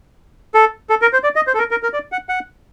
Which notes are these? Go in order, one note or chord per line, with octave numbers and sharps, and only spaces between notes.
A4
A4
A#4
C5
D5
D#5
C5
A4
A#4
A#4
A#4
D5
F#5
F#5